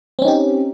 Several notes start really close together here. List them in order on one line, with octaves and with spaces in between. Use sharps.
C4 C#4 D#4 G4